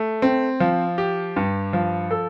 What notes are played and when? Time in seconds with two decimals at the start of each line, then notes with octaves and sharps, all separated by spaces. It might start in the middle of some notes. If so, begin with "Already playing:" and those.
Already playing: A3
0.22 C4
0.60 F3
0.98 G4
1.36 G2
1.73 F3
2.11 A4